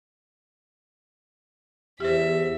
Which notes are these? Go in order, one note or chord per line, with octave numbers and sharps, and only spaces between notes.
E2 G4 C5 E5